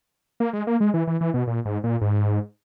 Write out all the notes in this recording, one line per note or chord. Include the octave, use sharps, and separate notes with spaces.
A#3
G#3
A#3
G#3
E3
E3
E3
B2
A#2
G#2
A#2
G#2